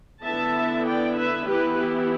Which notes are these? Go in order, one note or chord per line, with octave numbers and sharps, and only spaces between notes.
D3 B3 E4 E5 A5
D5 G5
B4 E5
E3 B3 E4 G4 B4
G4